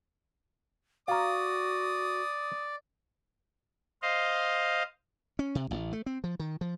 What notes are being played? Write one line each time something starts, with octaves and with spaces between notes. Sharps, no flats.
F#4 D5 F5 A#5 D#6
C5 D#5 F5
C#4
C3
A1
A3
C4
F3
D#3
F3